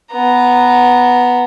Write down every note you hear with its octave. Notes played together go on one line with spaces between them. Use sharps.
B3 A#5